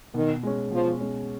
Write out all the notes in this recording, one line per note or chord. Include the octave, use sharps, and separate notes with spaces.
B2 D#3
G#3 C#4
B2 F3
G#3 C#4